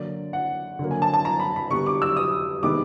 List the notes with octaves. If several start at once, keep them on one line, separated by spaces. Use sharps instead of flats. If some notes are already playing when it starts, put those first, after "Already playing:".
Already playing: D3 F#3 A#3 D5
F#5
D3 F#3 A#3
G#5
A5
A5
A#5
B5
B5
D3 G3 B3 C#6
D6
E6
D#6
C3 D#3 G#3 B3 D6